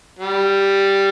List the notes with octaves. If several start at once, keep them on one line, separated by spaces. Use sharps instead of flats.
G3